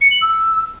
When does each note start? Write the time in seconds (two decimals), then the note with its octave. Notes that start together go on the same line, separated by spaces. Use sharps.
0.01 C#7
0.11 F#7
0.21 E6